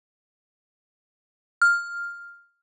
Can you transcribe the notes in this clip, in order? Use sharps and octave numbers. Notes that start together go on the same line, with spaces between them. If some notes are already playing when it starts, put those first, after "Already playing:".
F6